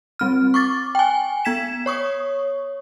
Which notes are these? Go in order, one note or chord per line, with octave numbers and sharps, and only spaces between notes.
G3 C4 F6
C#6 D6 A6
G5 G#5
B3 G#6 B6 E7
C#5 C#6 D#6